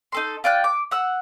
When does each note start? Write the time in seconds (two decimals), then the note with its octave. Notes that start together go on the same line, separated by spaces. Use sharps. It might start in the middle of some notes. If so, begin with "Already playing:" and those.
0.12 D#4 A4 C6
0.44 F4 D5 G5 F#6
0.64 D6
0.91 F#5 E6